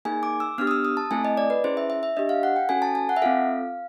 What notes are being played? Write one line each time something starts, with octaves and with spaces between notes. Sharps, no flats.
A#3 D#4 G#4 G#5
D6
E6
B3 D4 G4 F6
D#6
E6
D#6
A5
A3 C4 E4 A4 G#5
D#5
D5
B4
C#4 E4 G#4 C5
E5
E5
E5
D4 G4 D#5
F5
F#5
G5
C#4 F#4 A4 G#5
A5
G#5
F#5
E5
C4 F4 A4 F5